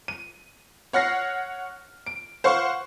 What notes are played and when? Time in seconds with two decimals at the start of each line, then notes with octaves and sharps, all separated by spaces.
0.08 D#7
0.93 C#5 F#5 F6 A#6 C7
2.06 D7
2.44 C5 F5 F#5 C#6